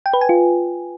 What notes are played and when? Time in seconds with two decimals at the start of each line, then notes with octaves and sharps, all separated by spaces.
0.06 G5
0.13 B4
0.21 G#5
0.29 F4